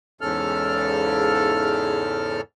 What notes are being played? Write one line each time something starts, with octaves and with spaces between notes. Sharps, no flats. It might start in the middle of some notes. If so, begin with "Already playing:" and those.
E2 G#2 C#3 A4 F6